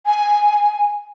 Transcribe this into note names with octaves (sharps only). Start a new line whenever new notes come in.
G#5